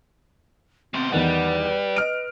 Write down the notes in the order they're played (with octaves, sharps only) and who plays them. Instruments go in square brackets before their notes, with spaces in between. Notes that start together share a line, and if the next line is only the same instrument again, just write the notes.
[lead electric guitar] B2 C5 [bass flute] C4
[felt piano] E2 D#3 F#5 [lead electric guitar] G3 [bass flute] B4
[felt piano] D#5 F6 D7